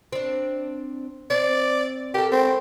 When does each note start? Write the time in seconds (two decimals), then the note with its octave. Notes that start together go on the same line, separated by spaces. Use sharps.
0.13 C4 D4
1.30 C4 D5
2.14 G4 A4 A#4
2.32 C4